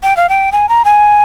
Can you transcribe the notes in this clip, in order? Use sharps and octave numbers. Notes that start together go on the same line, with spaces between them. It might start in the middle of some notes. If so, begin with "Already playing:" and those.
G5
F5
G5
G#5
A#5
G#5